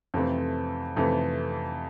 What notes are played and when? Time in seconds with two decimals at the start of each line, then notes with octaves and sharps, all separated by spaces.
0.14 F2 C3 E3 A3 C4
0.96 F2 C3 E3 A3 C4